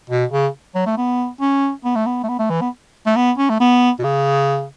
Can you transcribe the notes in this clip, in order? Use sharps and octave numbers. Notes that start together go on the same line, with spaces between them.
B2
C#3
F#3
A3
B3
C#4
B3
A3
B3
A3
B3
A3
E3
B3
A3
B3
C#4
A3
B3
B2
C#3